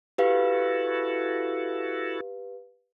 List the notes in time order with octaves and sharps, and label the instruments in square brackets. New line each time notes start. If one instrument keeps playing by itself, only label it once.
[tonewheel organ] E4 F#4 A4 [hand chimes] G4 B4 F5